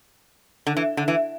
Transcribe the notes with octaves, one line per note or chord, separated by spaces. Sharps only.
D3
E3
D3
E3